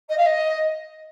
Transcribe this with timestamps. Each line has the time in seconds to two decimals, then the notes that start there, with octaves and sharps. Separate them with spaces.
0.09 D#5
0.17 F5
0.25 D#5